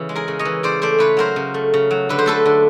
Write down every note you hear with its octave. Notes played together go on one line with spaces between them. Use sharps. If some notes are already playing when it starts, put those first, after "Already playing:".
Already playing: C#3 E3
G#3
G#4 A#4
C#3
C#5 D#5
E3
C#3 C5 D5
A3 C5 D5
C#3 B4 C#5
F#3 A#4 C5
C#3
A3
C#3
F#3
D3 B4
C5
A3 A4 B4
D3